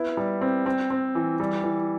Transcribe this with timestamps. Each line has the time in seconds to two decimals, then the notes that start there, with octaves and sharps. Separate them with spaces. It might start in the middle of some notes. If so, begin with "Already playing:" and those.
Already playing: B3 E4
0.17 G3
0.41 C4
0.66 C4
0.90 C4
1.15 E3
1.40 G3
1.64 E3